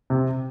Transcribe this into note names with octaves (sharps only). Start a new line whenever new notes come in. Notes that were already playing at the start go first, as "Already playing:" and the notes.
C3